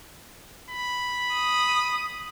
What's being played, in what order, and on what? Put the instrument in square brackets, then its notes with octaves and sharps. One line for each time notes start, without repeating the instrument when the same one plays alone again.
[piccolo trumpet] B5
[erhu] D#6